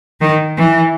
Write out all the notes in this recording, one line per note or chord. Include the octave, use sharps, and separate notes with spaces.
D#3
E3